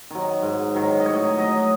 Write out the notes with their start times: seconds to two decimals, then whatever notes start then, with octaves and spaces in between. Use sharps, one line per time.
0.11 D#3 F#3
0.42 G#2
0.75 D#3 F#3
1.00 D#5
1.06 A2 C#5
1.37 F#3 D#5